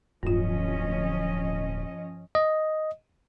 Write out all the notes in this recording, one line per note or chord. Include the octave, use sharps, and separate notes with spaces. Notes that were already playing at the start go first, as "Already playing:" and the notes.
D1 G2 F3 C#4 F4 D#5
D#5